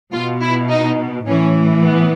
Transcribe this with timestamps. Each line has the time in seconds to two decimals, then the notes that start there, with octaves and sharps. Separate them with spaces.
0.13 B2 F4
0.42 E4
0.69 D#4
1.26 A2 E3 C#4
1.82 B3